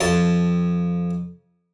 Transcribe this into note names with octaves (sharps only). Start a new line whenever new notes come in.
F2 A5